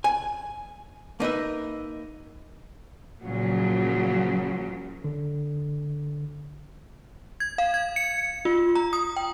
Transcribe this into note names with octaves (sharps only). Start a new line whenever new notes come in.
G#5
A#3 D#4 B4 E5
A#2 C#3 F3 F#3
D3
G#6
F5
G#6
C#7
F4
A#5
D#6
G5